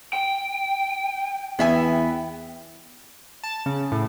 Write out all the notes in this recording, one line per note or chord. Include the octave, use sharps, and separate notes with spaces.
G5
E2 B3 E5 G#5
A5
C#3
A2